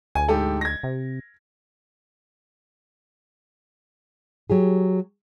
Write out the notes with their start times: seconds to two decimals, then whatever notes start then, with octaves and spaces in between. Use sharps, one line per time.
0.15 D2 G#5
0.28 G#2 G4 A4
0.61 G#6 A#6
0.83 C3
4.50 F#3 G4 G#4